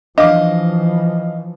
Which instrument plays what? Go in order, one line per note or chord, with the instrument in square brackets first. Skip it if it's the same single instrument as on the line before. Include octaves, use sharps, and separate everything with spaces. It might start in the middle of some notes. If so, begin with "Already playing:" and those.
[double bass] E3 F3 [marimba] D4 [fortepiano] D#5 F5 D6